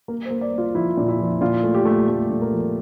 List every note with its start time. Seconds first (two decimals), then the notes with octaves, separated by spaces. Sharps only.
0.08 A#3 A#4
0.25 C5
0.31 A#3
0.41 D5
0.54 A#3 F4
0.75 F3 E4
0.97 A#2
1.08 E4
1.19 F3
1.41 A#2 F4
1.63 A3
1.74 G4
1.85 A3
2.08 A3 A4
2.30 A#2
2.41 A#4
2.51 F3